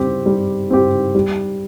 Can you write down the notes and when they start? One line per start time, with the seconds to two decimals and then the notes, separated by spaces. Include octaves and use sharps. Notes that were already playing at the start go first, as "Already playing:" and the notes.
Already playing: G3 C4 G4
0.26 G3
0.70 C4 G4
1.15 G3